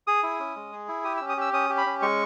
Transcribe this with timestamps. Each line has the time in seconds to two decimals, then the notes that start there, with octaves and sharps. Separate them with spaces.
0.07 G#4 D#6
0.23 E4
0.40 C#4
0.56 G#3
0.72 G#4
0.88 E4
1.04 G4 D#6
1.17 E6
1.21 C#4
1.29 D#6
1.37 G4 E6
1.53 C#4 D#6
1.70 G4
1.78 B5
1.86 C#4
2.02 G#3 C#6